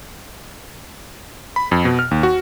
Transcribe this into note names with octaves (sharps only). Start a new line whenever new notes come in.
B5
F2
B2
F6
D#2
F#4